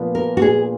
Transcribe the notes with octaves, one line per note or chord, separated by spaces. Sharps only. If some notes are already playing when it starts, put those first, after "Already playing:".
Already playing: A#2 F3 B3
B3 A#4
F#4
A#2 G#4